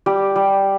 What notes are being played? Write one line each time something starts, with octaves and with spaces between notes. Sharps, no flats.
G3 G4
G3